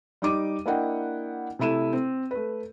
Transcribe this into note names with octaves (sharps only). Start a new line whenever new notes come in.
G3 D#4 D6 D#7
A#3 D4 E4 D#5 F#5 G5
C3 A3 E4 D#7 E7
C4
A3 B4